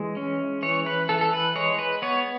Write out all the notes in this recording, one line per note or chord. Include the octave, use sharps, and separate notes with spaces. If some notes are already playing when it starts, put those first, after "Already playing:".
Already playing: E3 G#3
C#4
E3 C#5
B4
E3 A4
A4
B4
G#3 C#5
B4
B3 C#5